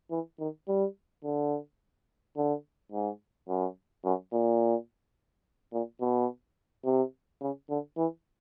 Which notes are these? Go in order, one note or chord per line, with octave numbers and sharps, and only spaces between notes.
E3
D#3
G3
D3
D3
G#2
F#2
F#2
A#2
A#2
B2
C3
C#3
D3
E3